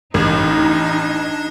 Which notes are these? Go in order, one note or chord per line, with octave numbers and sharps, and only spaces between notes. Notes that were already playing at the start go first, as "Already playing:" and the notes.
A1 D4 D#4